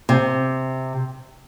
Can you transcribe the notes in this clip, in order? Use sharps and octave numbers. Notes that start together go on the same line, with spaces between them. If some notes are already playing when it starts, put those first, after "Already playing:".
C3